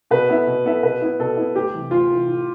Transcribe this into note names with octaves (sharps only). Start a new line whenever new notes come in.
B2 B4
B3 E4 A4 E5
B2
B3 E4 A4 E5
B2 B4
B3 E4
B2 A4
B3 E4
D2 G4
C3 E3
D2 F4
C3 E3
A2